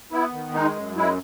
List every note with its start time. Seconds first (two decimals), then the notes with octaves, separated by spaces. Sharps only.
0.12 B3 E4
0.33 D#3
0.54 G#3 D#4
0.76 F#2
0.96 G#3 E4